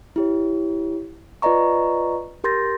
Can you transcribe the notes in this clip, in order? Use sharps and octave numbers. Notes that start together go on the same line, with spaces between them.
E4 G4 C#5
F4 B4 D5 D#5 A#5 C#6
G4 A#4 C6 G6 A6 A#6